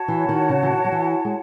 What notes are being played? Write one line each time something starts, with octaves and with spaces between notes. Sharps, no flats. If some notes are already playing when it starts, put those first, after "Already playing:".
Already playing: F#4 C#5 F#5 A5
E3
D#3
C#3
E3
D#3
F#3
E3
G#3